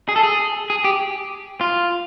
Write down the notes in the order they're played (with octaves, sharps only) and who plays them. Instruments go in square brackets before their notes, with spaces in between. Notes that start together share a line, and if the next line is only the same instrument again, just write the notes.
[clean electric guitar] G#4
A4
G#4
G#4
G4
F4